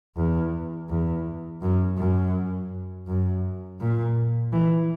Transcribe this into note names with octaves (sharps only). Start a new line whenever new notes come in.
E2
E2
F#2
F#2
F#2
A#2
E3